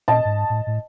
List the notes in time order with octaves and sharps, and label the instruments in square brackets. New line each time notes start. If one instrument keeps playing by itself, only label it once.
[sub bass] A#2 [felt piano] D#5 A5
[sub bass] G#2
A2
A2